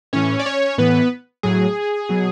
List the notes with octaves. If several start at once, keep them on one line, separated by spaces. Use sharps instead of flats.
A2 E3 C#4 C#5
D5
C#4 C#5
A2 E3 B3 B4
A2 F#3 G#4
B2 F#3